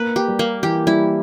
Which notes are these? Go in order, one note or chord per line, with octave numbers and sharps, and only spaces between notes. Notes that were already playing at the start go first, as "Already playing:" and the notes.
Already playing: A#3 B4
G4
G3
A#3
E3 G4
G3 E4